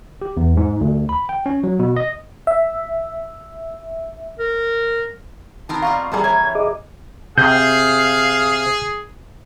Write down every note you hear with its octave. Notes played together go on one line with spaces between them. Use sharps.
G4
E2
G#2
D2
B5
G5
C#4
F#3
B2
D#5
E5
A#4
D#3 B3 C4 A#4 A5
G3 F4 D#5 F5 C#6
C3 E3 G3 A#3 G#4 A5
E3 C#5 E5 G#6
G#4 D#5 D6
C3 G#4 F5 G6